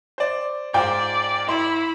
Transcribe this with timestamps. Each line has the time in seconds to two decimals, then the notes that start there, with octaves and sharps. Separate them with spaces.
0.18 C5 D5
0.74 G#2 F4 C5 D5 G5 G#5 D6
1.48 E4 E5 B5 C6